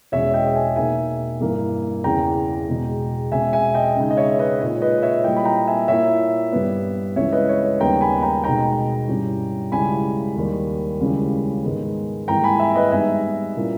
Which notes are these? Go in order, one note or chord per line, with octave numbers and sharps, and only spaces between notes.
E2 B2 G#3 C#4 C#5 E5
D#5 G5
E5 G#5
B2 A#3 D#4 E5 G#5
G2 E3 A#3
E2 C#3 E3 G5 A#5
E2 B2 G#3
B2 G#3 C#4 E5 G#5
E5 G#5
D#5 G5
C#3 G#3 D#4
D#5
C#5 E5
B4 D#5
A#2 G#3 D#4 C#5
B4 D#5
C#5 E5
A#2 G3 A#3 E4 D#5 G5
B5
G5 A#5
E5 G#5
A#2 A#3 E4 C#5 E5
G2 G3 B3
C#2 C#3 E3 C#5 E5
B4 D#5
C#5
B4
D#2 C#3 G3 B3 D#4 G5 A#5
G#5 B5
G5 A#5
B2 G#3 D#4 G5 A#5
G2 G3 C#4 E4
C#2 C#3 G3 C#4 E4 G#5 B5
D#2 D#3 G3
C#2 C#3 E3 G3 C#4
G#2 D#3 G#3 B3
G#2 E3 G3 A#3 G5 A#5
G#5 B5
E5 G#5
B4 D#5
G#2 G3 B3 D#4 E5 G#5
A#2 G3 A#3 C#4 E4